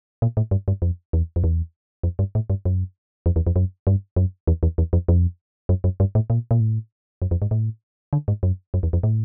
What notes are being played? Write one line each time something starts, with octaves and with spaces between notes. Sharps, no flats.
A#2
A2
G2
G2
F2
E2
F2
E2
F2
G2
A2
G2
F#2
F2
E2
F2
F#2
G2
F#2
E2
E2
E2
F2
F2
F#2
F#2
G2
A2
A#2
A#2
A2
F#2
F2
G#2
A2
D3
G#2
F#2
F#2
E2
F2
A2